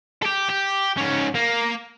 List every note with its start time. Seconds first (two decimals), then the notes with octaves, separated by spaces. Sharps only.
0.23 G4 A4
0.49 G4
0.98 G#2 C#4
1.35 A#3